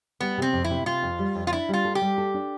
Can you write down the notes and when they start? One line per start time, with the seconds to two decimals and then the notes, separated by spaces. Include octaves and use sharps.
0.20 G3 B3
0.38 C3 C4
0.53 F2
0.64 E4
0.70 C3
0.86 C3 F4
1.03 F2
1.19 G3
1.35 F2
1.47 F4
1.52 D4 E4
1.69 G3 F4
1.85 A4
1.95 G4
2.01 G3
2.18 A4
2.34 D4